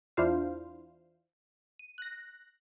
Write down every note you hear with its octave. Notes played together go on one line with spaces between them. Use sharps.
E2 D4 E4 F4 C5 F5
D#7
F#6 A#6